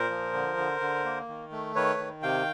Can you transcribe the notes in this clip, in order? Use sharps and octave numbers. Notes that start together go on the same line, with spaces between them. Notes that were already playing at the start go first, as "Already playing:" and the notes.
Already playing: A#2 A#4 C5
F3
D3
D3
D3
A#3
D#3
A3
D#3 B4 C#5
D#3
C3 F5 G5